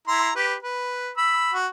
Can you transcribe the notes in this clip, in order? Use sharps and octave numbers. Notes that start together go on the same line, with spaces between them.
E4 A#5 C6
G4 B4
B4
B5 E6
F#4